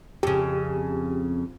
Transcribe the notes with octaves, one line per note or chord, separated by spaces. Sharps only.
F2 C#3 G4